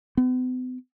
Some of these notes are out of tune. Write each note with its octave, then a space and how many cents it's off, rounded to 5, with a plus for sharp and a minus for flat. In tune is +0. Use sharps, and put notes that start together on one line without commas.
B3 +45